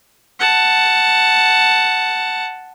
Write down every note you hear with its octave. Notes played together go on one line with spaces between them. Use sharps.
F#5 A5